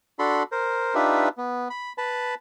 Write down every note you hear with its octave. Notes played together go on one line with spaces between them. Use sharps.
D4 F#4 A4 B5 C6
A#4 C5
D4 D#4 F4 G4 B4 E5
B3
B5
B4 A5 B5